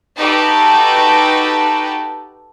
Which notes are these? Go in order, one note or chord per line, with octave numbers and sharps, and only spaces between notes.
D#4 F#4 G4 A4 B4 A5